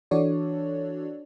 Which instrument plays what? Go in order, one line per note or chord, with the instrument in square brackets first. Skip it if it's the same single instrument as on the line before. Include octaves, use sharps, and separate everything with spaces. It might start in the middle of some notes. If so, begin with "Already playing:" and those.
[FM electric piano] E3 D4 F#4 A4 C#5 D5